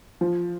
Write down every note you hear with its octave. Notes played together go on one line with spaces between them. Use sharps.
F3